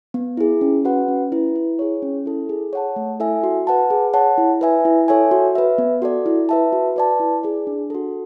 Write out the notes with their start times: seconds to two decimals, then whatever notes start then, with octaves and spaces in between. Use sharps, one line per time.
0.14 B3
0.37 E4 G#4
0.61 C#4
0.85 F#4 B4 F#5
1.08 C#4
1.32 E4 B4
1.56 E4
1.79 G#4 C#5
2.02 C#4
2.26 E4 A4
2.49 G#4
2.73 C#5 F#5 A5
2.96 A3
3.20 E4 A4 E5 G#5
3.44 F#4
3.67 B4 F#5 A5
3.90 G#4
4.14 C#5 F#5 A5
4.38 E4
4.61 B4 E5 G#5
4.85 E4
5.08 A4 C#5 E5 G#5
5.31 F#4
5.55 B4 E5
5.78 B3
6.02 F#4 A4 D5
6.26 E4
6.49 B4 E5 A5
6.73 F#4
6.96 B4 D5 A5
7.20 E4
7.43 G#4 D5
7.67 D4
7.90 F#4 A4